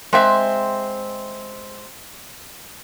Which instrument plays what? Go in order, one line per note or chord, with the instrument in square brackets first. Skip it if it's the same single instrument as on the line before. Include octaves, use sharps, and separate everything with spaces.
[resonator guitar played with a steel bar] G#3 C4 E5